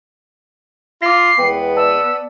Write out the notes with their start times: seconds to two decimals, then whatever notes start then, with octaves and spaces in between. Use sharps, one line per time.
1.02 F4 D6 A#6 C7
1.39 E2 G#3 B3 B4 G5
1.77 D5 A5 E6